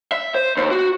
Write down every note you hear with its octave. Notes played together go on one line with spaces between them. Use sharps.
E5
C5
D#2
F#4